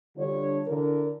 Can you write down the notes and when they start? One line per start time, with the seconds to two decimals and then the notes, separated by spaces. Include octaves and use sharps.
0.17 D3 G3 D4 F4 C#5
0.68 D3 E4 A#4